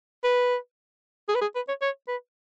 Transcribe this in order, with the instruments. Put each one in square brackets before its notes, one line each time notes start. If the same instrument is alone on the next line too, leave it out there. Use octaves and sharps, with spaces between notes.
[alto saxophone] B4
G#4
B4
G#4
B4
C#5
C#5
B4